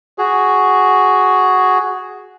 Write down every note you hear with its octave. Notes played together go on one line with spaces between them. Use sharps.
F#4 G#4